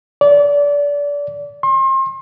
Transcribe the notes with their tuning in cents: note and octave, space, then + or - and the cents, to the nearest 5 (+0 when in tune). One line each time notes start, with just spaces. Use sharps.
D5 -25
C6 +35